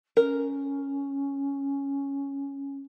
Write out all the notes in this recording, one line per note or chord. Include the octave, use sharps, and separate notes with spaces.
C#4 A#4